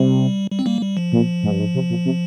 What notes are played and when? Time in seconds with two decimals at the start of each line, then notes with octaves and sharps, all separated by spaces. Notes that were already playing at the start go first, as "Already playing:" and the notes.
Already playing: C3 G3
0.51 G3
0.59 C4
0.66 G3 A#3
0.81 G3
0.97 F3
1.12 A#2
1.43 G#2
1.51 G2
1.60 G#2
1.74 C3
1.90 A#2
2.05 C3